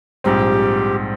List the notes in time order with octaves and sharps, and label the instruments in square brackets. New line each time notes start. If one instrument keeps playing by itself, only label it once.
[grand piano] A#1 G#2 G3 C4 [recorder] G4